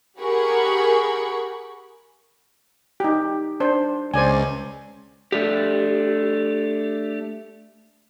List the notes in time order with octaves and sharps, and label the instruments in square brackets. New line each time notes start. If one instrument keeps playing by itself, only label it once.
[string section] G4 G#4 A#4 F#5 B5 C#6
[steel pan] D#4 G4
D4 C5
[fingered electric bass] C#2 [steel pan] C5 D5 G#5
[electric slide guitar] A3 D4 G4